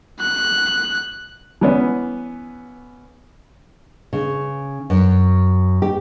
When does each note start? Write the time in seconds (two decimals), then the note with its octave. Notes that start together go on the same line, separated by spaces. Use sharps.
0.20 F#6
1.61 E3 B3 C#4
4.13 C#3
4.90 F#2
5.82 G4